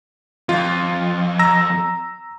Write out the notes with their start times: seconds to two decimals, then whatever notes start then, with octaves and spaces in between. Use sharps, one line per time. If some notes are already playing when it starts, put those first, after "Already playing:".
0.49 F2 F4
1.39 A#5 E6 A#6